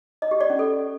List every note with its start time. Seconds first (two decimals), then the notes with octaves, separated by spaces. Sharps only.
0.22 D#5
0.31 G4
0.41 D5
0.50 C#4
0.59 A4